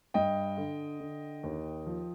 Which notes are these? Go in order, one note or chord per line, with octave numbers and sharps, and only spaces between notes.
G2 D#5 G5
D3
D3
D#2
F3